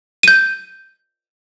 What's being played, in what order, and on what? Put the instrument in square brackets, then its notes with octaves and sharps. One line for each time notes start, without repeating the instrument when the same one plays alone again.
[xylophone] G6 D#7